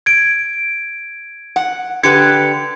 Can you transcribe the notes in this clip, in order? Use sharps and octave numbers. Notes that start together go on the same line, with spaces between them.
G#6 D7
F#5
D3 G4 B4 G#6 C#7